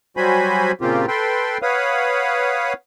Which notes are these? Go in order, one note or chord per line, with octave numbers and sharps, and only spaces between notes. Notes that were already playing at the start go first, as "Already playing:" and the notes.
F#3 G3 F#4 C5 G#5 B5
A#2 C#3 A#3 C4 F4 G4
A4 B4 G5 C6
B4 C#5 F5 F#5 D#6